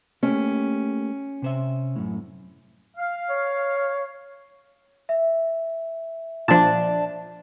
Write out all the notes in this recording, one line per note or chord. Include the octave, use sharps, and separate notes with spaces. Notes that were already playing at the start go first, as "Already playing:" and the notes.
A3 A#3 C#4 G4
C3 C5 E5
F#2 A2
F5
C#5
E5
A#2 F3 D4 A5